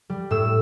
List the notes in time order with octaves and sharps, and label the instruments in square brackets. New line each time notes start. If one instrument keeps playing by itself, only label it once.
[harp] G3
A2 E6